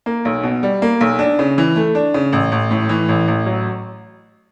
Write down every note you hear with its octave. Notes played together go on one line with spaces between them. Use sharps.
A#3
B1
B2
G3
A#3
B1
D4
C#3
E3
A3
D4
C#3
A1
A1
A2
E3
A1
A1
F#3